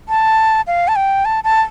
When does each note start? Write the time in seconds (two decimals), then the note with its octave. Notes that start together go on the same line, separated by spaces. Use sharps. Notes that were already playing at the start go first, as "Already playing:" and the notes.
0.09 A5
0.67 F5
0.88 A5
0.96 G5
1.25 A5
1.44 A5